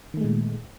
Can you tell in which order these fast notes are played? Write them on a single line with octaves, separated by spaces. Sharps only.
D#3 A3 G#3 A#2